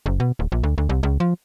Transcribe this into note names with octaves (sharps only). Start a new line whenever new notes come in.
F#1
B2
D1
A#1
D2
D2
C2
C#2
F3